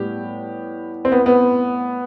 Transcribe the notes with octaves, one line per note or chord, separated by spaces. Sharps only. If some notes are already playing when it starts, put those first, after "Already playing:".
Already playing: A2 G3 B3 G4
C4
B3
B3